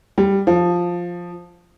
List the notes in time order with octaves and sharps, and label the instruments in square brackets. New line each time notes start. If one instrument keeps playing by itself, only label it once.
[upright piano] G3
F3